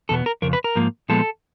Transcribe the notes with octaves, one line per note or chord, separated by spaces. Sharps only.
E2 B2 B3 A4
A#4
F2 C#3 A#4
B4
A#4
G#2 F3 A#3
A#2 F3 G#3 B3 A4